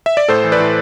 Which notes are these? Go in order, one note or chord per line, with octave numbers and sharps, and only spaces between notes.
E5
D5
A2 A4 C5
E3
B4 D5
A2